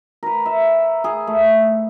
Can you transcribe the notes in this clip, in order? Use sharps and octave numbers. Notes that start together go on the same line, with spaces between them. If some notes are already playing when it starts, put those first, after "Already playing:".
A#4 B4
E5
G#4
A3